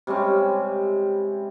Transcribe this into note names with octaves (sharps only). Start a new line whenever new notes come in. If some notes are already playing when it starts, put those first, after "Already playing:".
C3 G3 G#3 C#4